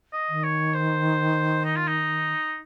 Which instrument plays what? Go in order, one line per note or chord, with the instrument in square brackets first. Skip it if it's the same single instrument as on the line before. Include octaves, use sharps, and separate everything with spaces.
[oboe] D#5
[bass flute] D#3
[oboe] C#5
C5
D#4
F4
D#4